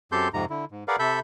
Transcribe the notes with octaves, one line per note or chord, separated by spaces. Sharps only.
F#2 C4 G4 A4 C6 G6
F2 G#2 C3 A#5
D3 E4
G#2
G#4 A#4 B4 D5 F5 F#5
C3 A4 E5 B5 G6